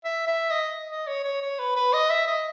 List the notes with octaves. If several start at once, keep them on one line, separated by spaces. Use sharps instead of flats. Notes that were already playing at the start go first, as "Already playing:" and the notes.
E5
E5
D#5
D#5
C#5
C#5
C#5
B4
B4
D#5
E5
D#5